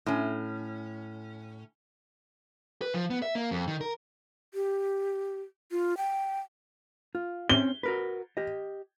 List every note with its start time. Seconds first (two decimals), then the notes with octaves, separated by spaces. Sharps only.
0.06 A2 C#4
2.82 B4
2.94 F3
3.10 B3
3.22 E5
3.35 A#3
3.51 F2
3.67 D#3
3.81 A#4
4.54 G4
5.72 F4
5.97 G5
7.15 F4
7.50 C4 C#4 G7
7.83 F#4 A#4 B4
8.37 G4 D#5